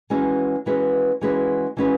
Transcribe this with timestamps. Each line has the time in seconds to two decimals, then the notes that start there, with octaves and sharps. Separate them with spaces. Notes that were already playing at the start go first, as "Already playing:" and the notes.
0.10 E3 G#3 C#4 F#4 B4
0.66 E3 G#3 C#4 F#4 B4
1.21 E3 G#3 C#4 F#4 B4
1.77 E3 G#3 C#4 F#4 B4